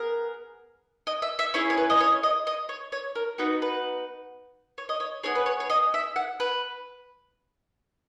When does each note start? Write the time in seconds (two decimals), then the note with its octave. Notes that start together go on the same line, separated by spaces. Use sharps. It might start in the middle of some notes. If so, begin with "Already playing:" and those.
Already playing: B3 G#4 A#4
1.07 D#5
1.22 E5
1.39 E5
1.54 C#4 E4 G#4 C#5
1.70 C#5
1.77 B4
1.90 D#5
2.01 C#5
2.23 D#5
2.47 D#5
2.69 C#5
2.92 C#5
3.15 A#4
3.38 B3 D#4 F#4 B4
3.62 B4
4.78 C#5
4.89 D#5
5.00 C#5
5.23 B3 D#4 G#4 C#5
5.35 B4
5.46 C#5
5.60 C#5
5.70 D#5
5.94 E5
6.16 F#5
6.40 B4